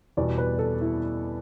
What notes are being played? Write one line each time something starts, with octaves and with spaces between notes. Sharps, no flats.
E2 B2 G3 D5
B4
A4
E4